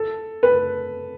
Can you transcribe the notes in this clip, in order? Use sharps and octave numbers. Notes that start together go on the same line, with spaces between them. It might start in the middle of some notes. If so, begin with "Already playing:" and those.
Already playing: A4
B4